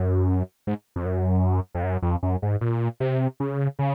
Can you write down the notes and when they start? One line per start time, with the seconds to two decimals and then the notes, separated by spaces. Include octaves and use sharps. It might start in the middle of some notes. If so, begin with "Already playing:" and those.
Already playing: F#2
0.67 G#2
0.96 F2
1.06 F#2
1.75 F2
1.84 F#2
2.02 F2
2.23 F#2
2.42 G#2
2.61 A#2
3.00 C3
3.40 C#3
3.79 C#3